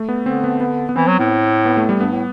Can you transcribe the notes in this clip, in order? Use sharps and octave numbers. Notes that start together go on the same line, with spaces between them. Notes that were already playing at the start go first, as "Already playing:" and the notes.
Already playing: A3
B3
D3 C4
B3
B3
B3
E3 C4
F#3
A2
B3
A3
G3
G2 B3
A2